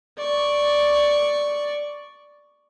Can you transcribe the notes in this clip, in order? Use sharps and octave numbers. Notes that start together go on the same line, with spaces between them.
D5 C#6